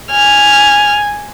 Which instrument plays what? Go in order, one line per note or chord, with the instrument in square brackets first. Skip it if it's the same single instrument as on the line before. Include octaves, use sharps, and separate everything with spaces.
[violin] G#5 [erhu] F6